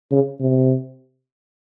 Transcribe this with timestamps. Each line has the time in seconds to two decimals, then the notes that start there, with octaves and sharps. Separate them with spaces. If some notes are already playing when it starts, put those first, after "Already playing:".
0.12 C#3
0.40 C3